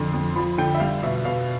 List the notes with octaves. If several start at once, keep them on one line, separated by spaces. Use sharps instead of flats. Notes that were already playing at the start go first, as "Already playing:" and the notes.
Already playing: F2 D3 C6
F2
F3 B5
D3 G5
E5
G3 F5
B2 E5
B2 F5